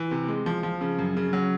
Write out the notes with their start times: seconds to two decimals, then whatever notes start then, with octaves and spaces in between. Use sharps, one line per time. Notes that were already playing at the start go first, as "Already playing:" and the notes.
Already playing: E3
0.11 C3
0.28 G#3
0.46 F3
0.63 F3
0.81 C#3
0.99 F#2
1.17 C#3
1.33 F#3